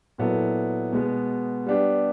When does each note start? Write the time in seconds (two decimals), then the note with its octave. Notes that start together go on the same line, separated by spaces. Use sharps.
0.18 A#2 F#3 B3 E4 A4
0.93 B2 G#3 B3
1.66 G3 B3 D4 G4